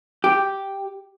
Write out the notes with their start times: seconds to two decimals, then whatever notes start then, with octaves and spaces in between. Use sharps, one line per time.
0.24 G4